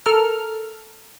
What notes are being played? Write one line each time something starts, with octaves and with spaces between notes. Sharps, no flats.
A4 A#4 F6